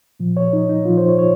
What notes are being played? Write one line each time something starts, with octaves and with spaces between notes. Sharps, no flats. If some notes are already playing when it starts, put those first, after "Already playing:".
A#2 F3
C#5
D#4
D#4
A#2 F3 F4
C5
C#5
C#5